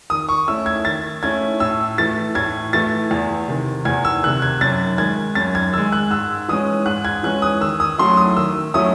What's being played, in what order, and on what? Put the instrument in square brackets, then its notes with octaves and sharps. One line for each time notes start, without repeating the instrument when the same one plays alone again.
[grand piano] D#3 D#6
C#6
A3 C#4 E4 E6
G#6
D#3 A6
A3 C#4 E4 G#6
A2 E6
E3 A3 A6
A2 G#6
E3 A3 A6
E2
C3 D#3
E2 G#6
E6
C3 D#3 F#6
G#6
F#2 A6
D#3 G#3 G#6
F#2 A6
G#6
D#3 G#3 E6
F#6
G#2 E6
E3 G#3 C#4 D#6
G#2 F#6
G#6
E3 G#3 C#4 F#6
D#6
D#3 E6
D#6
F#3 A3 C#4 E4 C6
D#6
D#3 E6
F#3 A3 C#4 E4 D#6